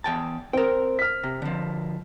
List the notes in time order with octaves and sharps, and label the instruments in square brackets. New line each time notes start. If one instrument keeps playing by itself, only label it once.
[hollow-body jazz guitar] E2 G5 A5
[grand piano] C4 [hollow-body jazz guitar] A#4 G5
[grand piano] F6 B6
[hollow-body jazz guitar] C3
D3 F3